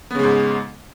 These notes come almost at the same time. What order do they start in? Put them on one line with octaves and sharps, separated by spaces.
B3 C#3 G#3 G#2